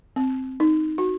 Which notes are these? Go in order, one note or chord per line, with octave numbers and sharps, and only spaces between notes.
C4
D#4
F#4